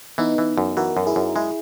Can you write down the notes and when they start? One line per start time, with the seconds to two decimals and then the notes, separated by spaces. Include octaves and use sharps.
0.18 E3 B3 D#4
0.38 E3
0.58 F#2
0.77 E3 F#4 A#4
0.97 F#2
1.07 E4 G#4
1.16 F#2
1.36 G#3 E4 G#4